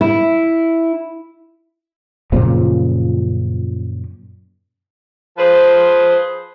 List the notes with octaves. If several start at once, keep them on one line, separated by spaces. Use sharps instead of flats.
E4
F#2 A#2 C#3 F3
F3 G#4 B4 C5